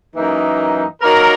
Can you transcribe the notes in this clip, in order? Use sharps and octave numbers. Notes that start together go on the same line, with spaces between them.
F#2 E3 A#3 D#4
F#3 A#3 D#4 A#4